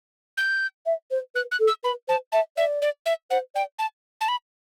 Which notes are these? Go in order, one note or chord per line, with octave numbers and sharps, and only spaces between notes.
G6
E5
C5
B4 F#6
F#6
A4
E6
B4 B5
C5 A5
E5 A5
D5 E5
D5
E5
C5 F#5
D5 G5
A5
A5
B5